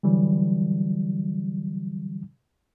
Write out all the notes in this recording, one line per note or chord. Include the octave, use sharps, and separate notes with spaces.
D3 E3 F#3 G3